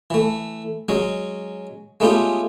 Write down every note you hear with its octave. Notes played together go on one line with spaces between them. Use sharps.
E3 A3
F#3 G#3 C#4
G#3 A3 B3 C#4 F4 G4